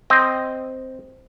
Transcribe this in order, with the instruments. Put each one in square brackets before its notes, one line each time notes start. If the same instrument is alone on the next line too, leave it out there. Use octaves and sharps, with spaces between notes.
[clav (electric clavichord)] C4 D#5